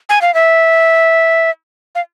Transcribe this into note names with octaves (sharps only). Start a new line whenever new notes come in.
G#5
F5
E5
F5